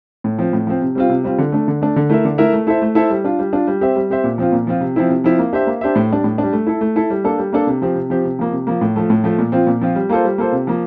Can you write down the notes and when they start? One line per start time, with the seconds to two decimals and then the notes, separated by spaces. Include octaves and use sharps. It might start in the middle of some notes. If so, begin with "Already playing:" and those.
0.24 A2
0.38 F3 C4
0.53 A2
0.67 F3 C4
0.82 C3
0.95 G3 C4 F4
1.09 C3
1.24 G3 C4 F4
1.38 D3
1.52 A3 D4
1.68 D3
1.81 A3 D4
1.96 D3
2.09 A3 E4 A#4 E5
2.25 D3
2.38 A3 E4 A#4 E5
2.53 A3
2.67 E4 A4 C5 E5
2.82 A3
2.95 E4 A4 C5 E5
3.10 G3
3.24 D4 F4
3.39 G3
3.53 D4 F4
3.67 G3
3.81 C4 G4 C5 E5
3.96 G3
4.10 C4 G4 C5 E5
4.24 A#2
4.38 F3 C4 F4
4.52 A#2
4.67 F3 C4 F4
4.81 C3
4.96 F3 C4 E4
5.09 C3
5.24 F3 C4 E4
5.39 A#3
5.53 D4 G4 C5 E5
5.67 A#3
5.81 D4 G4 C5 E5
5.96 A2
6.10 G3 D4
6.24 A2
6.38 G3 D4
6.53 A3
6.67 E4 A4
6.81 A3
6.96 E4 A4
7.10 G3
7.24 A#3 D4 A4
7.38 G3
7.53 A#3 D4 A4
7.67 C3
7.82 F3 C4 G4
7.95 C3
8.10 F3 C4 G4
8.25 C3
8.39 F3 A#3
8.52 C3
8.67 F3 A#3
8.81 A2
8.96 F3 A3
9.10 A2
9.24 F3 A3
9.39 A#2
9.52 F3 C4 F4
9.67 A#2
9.81 F3 C4 F4
9.95 G3
10.09 A#3 F4 A4 C5
10.24 G3
10.38 A#3 F4 A4 C5
10.52 C3
10.67 F3 A#3